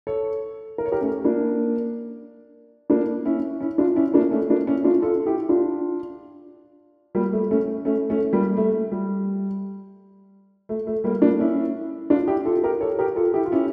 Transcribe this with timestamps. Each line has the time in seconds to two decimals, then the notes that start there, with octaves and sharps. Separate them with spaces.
0.07 A4 C#5
0.78 A#4
0.86 C#5
0.92 G4 A#4
1.01 A3 C#4
1.24 A#3 D4
2.90 A#3 D4
3.25 C#4 E4
3.60 C#4 E4
3.78 D4 F4
3.96 C#4 E4
4.14 A#3 D4
4.31 A3 C#4
4.50 A#3 D4
4.67 C#4 E4
4.84 D4 F4
5.02 F4 A4
5.26 E4 G4
5.49 D4 F4
7.15 G3 A#3
7.33 A3
7.51 A3 C#4
7.85 A3 C#4
8.10 A3 C#4
8.33 G3 A#3
8.57 A3
8.92 G3
10.69 A3
10.87 A3
11.04 G3 A#3
11.22 A#3 D4
11.39 C#4 E4
12.10 D4 F4
12.28 E4 G4
12.45 F4 A4
12.64 G4 A#4
12.81 A4 C#5
12.99 G4 A#4
13.16 F4 A4
13.34 E4 G4
13.46 F4
13.52 C#4 E4